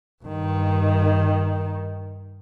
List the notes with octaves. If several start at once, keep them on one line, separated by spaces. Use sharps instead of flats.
G2 D#3